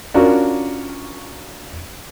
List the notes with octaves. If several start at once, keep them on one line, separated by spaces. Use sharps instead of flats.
C#4 D4 F4 F#4 A#4